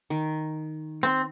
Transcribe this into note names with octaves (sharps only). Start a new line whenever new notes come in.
D#3
C4